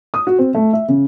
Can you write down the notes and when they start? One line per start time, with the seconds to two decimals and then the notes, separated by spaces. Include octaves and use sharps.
0.14 D#6
0.27 F#4
0.39 C4
0.55 A3
0.73 E5
0.88 C#3